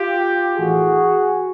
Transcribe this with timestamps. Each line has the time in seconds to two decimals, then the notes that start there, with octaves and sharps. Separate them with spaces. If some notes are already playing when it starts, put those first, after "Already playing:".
Already playing: F4 G4
0.57 A2 E3 F#4 G#4